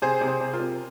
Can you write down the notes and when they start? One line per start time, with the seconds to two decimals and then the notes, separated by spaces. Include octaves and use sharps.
0.02 C3 G#4 C5
0.21 C3
0.27 G#4 C5
0.40 C3
0.53 F4 A#4
0.59 C3